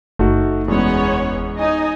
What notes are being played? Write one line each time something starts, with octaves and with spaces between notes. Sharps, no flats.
F#1 A3 D#4 F#4
E2 G#3 B3 C#4 C#5
D#4 D#5 G#5